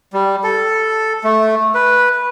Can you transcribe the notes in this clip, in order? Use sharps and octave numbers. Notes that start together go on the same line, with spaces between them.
G3
A4
A3
B4